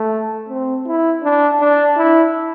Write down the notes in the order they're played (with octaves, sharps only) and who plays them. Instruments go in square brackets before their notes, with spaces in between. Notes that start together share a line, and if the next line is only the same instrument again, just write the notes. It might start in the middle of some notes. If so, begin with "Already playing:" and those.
Already playing: [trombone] A3
C4
E4
D4
D4
E4